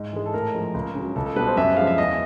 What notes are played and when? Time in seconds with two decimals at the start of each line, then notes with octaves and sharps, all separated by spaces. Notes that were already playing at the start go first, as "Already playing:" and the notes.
Already playing: G#2
0.13 E3 G#3
0.26 A4
0.34 A2 A#4
0.55 F3 G#3
0.74 C#2
0.95 C#3
1.00 F#3
1.16 C#2 A4
1.26 A4
1.36 B2 G3 B4
1.47 C5
1.57 F#2 E5
1.77 C#3 F3 G#3 F5
1.87 E5
1.98 E2 D#5